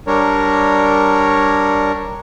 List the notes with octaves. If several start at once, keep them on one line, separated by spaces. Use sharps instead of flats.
G3 D4 A#4 C#5